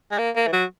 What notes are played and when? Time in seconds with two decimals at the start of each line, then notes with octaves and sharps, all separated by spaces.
0.12 G#3
0.18 A#3
0.36 A#3
0.47 E3
0.53 F#3